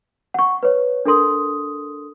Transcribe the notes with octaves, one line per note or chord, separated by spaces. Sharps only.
F#5 C#6
B4 C#5
D4 A4 A#4 C6 D#6